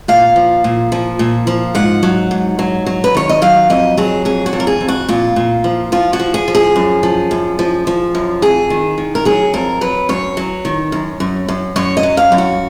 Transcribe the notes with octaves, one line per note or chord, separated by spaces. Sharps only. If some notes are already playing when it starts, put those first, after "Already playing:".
A#2 F5
F3
A#2
F3
A#2
F3
G#2 F#5
F#3
G#2
F#3
F#3
B4
D#3 C#5
D#5
F#3 F5
F2 D#5
F#3 G#4
F2 G#4
F#4
F2
A#4
G#4
F2
F#4
A#2 F4
A#2
F3
F3 F4
F#4
F3
G#4
F3
G#4
F#2
F3
F#2
F3
F3
F#2
F2 G#4
D#3
D#3
A#4
F#3 G#4
F2 A#4
F#3 B4
F#2 C#5
F#3
D#3
F#2
F#2
F#2
F#2 C#5
D#5
F#3
F5
F#2
F#4